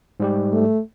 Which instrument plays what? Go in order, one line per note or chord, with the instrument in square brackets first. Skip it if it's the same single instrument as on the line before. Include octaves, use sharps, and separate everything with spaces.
[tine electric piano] G#2 G3 G4
[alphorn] A3